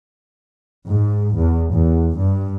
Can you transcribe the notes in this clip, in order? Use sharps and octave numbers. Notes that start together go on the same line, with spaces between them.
G#2
E2
E2
G2